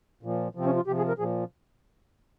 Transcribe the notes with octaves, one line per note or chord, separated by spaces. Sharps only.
A#2 F3
C3 F3 C4
C#4
F4
C3 F3 G4
G#4
A#4
A#2 F3 G#4